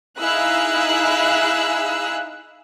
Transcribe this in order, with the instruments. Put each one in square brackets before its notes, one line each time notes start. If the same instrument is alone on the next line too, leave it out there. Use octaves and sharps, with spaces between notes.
[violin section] D#4 E4 G#4 F5 E6 F#6